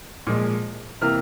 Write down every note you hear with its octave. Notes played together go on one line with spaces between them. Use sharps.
A#2 F3 G#3
C3 E3 A#3 F6